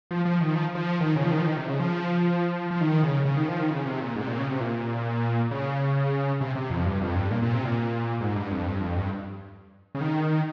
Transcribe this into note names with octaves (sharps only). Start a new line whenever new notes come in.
F3
F3
D#3
F3
F3
D#3
C#3
F3
D#3
F3
D#3
C3
C#3
F3
F3
D#3
C#3
C#3
D#3
F3
D#3
C#3
C3
A#2
G#2
C3
A#2
C#3
C3
A#2
C#3
C3
C3
F2
G2
F2
G2
A#2
A#2
C3
A#2
G#2
G2
F2
G2
F2
G2
C#3
D#3